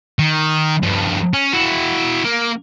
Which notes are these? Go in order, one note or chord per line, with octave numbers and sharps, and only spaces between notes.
D#3
G2 F3
C#4
E4 F#4
A#3